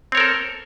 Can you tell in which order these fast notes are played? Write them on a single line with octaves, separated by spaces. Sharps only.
C4 C#5 A#4 A4